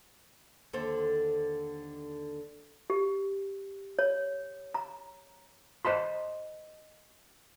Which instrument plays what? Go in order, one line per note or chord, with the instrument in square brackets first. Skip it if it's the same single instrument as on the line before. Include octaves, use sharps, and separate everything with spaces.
[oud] D#2 D3 C5
[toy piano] G4
C#5
A#5
[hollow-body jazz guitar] C5 D#5 A5 B5 C6